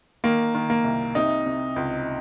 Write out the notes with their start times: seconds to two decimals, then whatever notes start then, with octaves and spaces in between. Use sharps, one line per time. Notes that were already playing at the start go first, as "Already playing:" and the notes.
0.24 D#3 A#3
0.54 D#3
0.70 A#3
0.84 C2
1.15 C3 D#4
1.46 C3
1.76 C#2